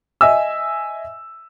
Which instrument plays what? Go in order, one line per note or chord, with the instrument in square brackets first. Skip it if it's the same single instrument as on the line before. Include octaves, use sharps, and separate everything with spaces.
[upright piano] D#5 E5 G#5 E6